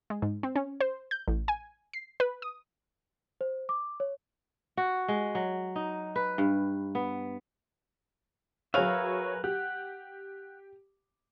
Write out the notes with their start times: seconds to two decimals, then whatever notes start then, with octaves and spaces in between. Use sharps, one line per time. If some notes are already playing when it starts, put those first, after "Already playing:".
0.10 G#3
0.22 G#2
0.43 C4
0.56 C#4
0.80 C5
1.11 G6
1.28 A1
1.48 G#5
1.93 C7
2.20 B4
2.42 D#6
3.41 C5
3.69 D6
4.00 C#5
4.77 F#4
5.08 G#3
5.35 F#3
5.76 D#4
6.16 B4
6.38 G2
6.95 B3
8.74 F#3 G#4 A#4 B4 C#5 E5 F5
9.44 G4 F#5